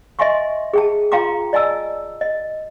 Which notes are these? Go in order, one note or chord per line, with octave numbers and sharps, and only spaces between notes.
D#5 E5 G#5 C6 C#6
G#4 G5 A5
F4 F5 G5 A#5 C6 D6
D5 D#5 G#5 A5 E6
D#5